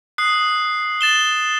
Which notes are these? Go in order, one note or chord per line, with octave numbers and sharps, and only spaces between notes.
D#6 F#6 C7
A6 E7 G7